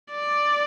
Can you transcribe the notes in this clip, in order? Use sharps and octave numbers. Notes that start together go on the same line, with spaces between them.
D5